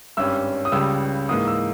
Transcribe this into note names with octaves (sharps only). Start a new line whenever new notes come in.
G#1 G2 G3 C#4 E6
D#6
C#2 C#3 G3 E6
G#2 E3 A#3 D#6
E6